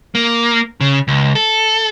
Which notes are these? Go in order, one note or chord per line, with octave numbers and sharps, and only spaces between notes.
A#3
C#3
C#2
A4